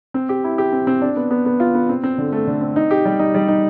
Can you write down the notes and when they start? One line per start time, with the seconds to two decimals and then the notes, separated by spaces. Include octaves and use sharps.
0.14 C4
0.29 G4
0.44 E4
0.58 G4
0.72 C4
0.87 C4
1.01 D4
1.16 B3
1.31 B3
1.46 B3
1.60 F4
1.75 B3
1.89 C4
2.04 C4
2.18 D3
2.32 A3
2.47 D3
2.61 C4
2.76 D#4
2.91 G4
3.05 G3
3.19 D#4
3.34 G3
3.48 D#4